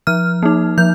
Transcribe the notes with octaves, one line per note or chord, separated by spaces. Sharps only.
F3 F6
A#3 D#4
F3 G6